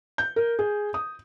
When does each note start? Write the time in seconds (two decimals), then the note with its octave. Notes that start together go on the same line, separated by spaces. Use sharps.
0.18 G6
0.36 A#4
0.59 G#4
0.94 D#6